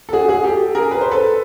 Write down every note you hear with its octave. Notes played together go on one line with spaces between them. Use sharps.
A4
F#4 G#4
F#4 G#4
G4 A4
G#4 A#4
B4
C5
A4 B4